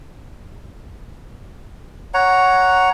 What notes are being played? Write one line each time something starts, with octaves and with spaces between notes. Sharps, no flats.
C#5 F#5 A#5